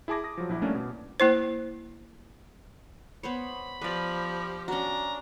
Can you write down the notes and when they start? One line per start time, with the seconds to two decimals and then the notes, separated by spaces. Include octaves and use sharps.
0.08 E4 G#4 A5 D6 A#6
0.24 D#6 A#6
0.38 F3 F#3
0.49 A#1 E4
0.62 G3 A3 A#3 C#4 D4
0.75 B2
1.20 A#3 E4 C5
3.23 B3 C5 C#5 B5
3.82 F3 G4 B4 D5
4.68 C#4 D4 F#4 A#5